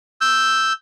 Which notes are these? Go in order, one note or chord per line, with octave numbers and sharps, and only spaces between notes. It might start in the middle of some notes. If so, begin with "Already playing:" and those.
E6 G6